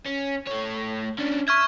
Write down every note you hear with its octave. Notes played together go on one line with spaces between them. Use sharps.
C#4
A3 C#5
C#4 D4
E5 C#6 F6 G#6